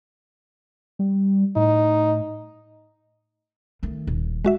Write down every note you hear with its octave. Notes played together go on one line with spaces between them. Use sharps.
G3
A2 D#4
D#3 A3
D#1
G#3 F#4 E5